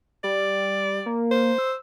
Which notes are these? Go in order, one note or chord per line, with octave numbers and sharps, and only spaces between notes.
G3 D5
A#3
C5
E6